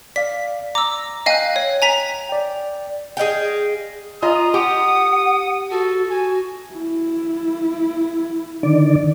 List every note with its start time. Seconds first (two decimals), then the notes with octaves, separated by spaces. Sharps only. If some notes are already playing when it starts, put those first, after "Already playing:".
0.16 D5 F5 B6
0.75 A#5 D6 E6
1.26 D#5 F5 G5 G#5 F#6
1.56 C#5
1.82 G#5 A#5 B6
2.29 D5 G5
3.17 G#4 D#5 F5 G5
4.22 F4 D#5 A#5 D#6
4.54 G4 F#5
5.71 F#4 A4
6.10 F#4 G#5
6.73 E4
8.63 D3 D#3 D5